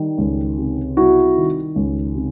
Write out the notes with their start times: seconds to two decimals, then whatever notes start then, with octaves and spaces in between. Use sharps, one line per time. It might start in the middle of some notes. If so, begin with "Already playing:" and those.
Already playing: D#3 G3
0.18 C#2
0.58 C3
0.96 G3 E4 F#4
1.37 D#3
1.76 C#2
2.15 C3